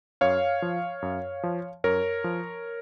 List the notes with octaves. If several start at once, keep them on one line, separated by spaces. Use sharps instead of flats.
F#2 C#5 F5
F3
F#2
F3
F#2 A#4 C#5
F3